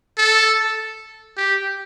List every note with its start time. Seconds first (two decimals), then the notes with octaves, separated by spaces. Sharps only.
0.18 A4
1.37 G4